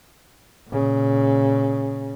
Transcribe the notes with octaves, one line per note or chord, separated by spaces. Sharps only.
A#2 C#3